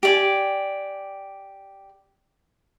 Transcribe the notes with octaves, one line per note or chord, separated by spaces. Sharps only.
G4 D5 G#5